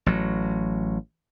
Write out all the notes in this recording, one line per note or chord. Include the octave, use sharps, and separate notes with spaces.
A1 F#3